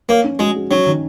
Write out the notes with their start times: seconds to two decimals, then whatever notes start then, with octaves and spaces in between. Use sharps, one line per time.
0.09 A#3 C#5
0.24 C#4
0.39 G#3 F#4
0.55 G#3
0.71 F#3 C#4
0.86 D#3